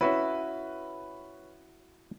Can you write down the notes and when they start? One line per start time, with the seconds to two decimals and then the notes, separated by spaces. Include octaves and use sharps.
0.01 C#4 E4 F#4 B4 E5